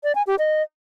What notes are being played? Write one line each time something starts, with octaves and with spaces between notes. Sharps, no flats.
D5
G#5
G4
D#5